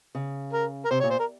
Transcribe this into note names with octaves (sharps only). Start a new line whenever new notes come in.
C#3
A#4
A#4
C3 C5
C#5
A#2
C5
A#4